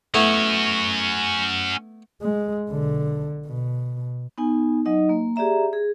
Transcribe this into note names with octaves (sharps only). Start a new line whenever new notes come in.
A3 B3 C#4 E4 F#4
G#3
B1 D3
B2
B3 D#4 G#5
F#3 D#4 D#5
A#3
G4 G#4 D5 E5 A#5
G#4